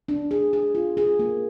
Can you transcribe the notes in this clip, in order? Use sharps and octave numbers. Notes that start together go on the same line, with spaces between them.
D4
G#4
G#4
F4
G#4
A#3